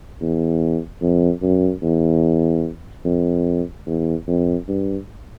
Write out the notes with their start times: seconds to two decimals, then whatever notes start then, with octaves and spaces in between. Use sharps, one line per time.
0.21 E2
1.02 F2
1.42 F#2
1.83 E2
3.05 F2
3.87 E2
4.28 F2
4.68 G2